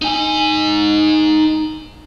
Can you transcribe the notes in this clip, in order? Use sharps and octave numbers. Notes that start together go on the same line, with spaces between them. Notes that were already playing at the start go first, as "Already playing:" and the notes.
D#4 G#5